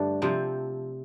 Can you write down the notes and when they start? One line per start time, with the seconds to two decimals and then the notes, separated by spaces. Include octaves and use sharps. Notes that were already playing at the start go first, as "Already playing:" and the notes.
Already playing: G2 D3 A3 D4
0.22 C3 F3 C4